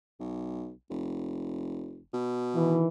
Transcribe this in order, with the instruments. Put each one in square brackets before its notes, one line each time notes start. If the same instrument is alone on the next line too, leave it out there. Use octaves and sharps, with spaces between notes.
[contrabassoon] B1
F1
B2
[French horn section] D#3 E3